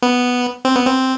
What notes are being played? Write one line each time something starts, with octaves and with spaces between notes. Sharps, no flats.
B3
C4
B3
C4